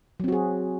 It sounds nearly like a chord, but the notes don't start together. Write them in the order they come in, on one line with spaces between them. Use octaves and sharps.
F#3 C4 F#4 G#4